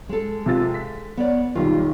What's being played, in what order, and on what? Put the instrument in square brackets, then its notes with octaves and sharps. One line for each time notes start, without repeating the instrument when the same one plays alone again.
[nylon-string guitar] G#3 A4
[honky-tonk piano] C3 F4 A6
B6
[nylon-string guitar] B3 C#5 D5
[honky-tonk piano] B1 D#3 [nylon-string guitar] G3 F4